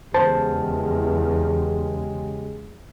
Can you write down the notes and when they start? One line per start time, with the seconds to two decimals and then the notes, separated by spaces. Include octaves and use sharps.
0.14 E2 C#3 G#3 G4 C5 A5